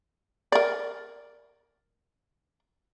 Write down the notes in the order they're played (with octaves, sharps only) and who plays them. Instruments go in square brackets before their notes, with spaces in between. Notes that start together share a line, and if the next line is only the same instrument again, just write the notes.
[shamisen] A#4 D5